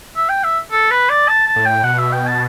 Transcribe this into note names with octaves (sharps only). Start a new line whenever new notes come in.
E5
G5
E5
A4
B4
D5
A5
A5
A2
G5
B2 F#5
E5
G5
A5